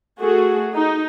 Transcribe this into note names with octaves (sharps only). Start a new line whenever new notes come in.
A3 F#4 G#4 A4
D#4